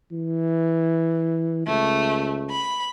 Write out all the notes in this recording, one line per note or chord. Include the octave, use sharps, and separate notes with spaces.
E3
C#2 A3
B5